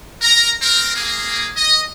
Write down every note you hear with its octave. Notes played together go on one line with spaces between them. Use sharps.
A#4 A#5
C4 A#4
A#3 G#4
D#5